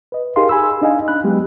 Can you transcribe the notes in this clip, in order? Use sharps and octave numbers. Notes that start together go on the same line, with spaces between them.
B4 D#5
D#4 G4 G#4 A#4 F5 C6
G#5 B5 E6
D4 D#4 D#5 F5 G#5
D4 B5 F#6
F#3 G#3 B3 G4